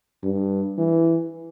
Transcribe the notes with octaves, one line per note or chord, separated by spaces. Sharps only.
G2
E3